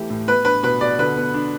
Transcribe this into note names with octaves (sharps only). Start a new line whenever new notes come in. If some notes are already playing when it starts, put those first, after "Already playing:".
Already playing: E3 A3 G4
A2
B3 B4
D4 B4
B2 B4
B2 D5
D3 B4
B3
D4